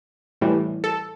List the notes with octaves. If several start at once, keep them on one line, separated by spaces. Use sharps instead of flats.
A2 E3 G3
A4